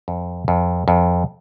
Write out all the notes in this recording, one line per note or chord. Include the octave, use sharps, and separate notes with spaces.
F2
F2
F2